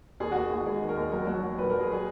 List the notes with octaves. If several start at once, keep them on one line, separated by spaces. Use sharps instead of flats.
D#2 G#4
F#4
D#2
G#4
D#2 F#4
G#3 G#4
D#3
A#4
D#2
F#3 A#4
F#3
F#3
A#2 B4
A#4
F#3
G#4
G#4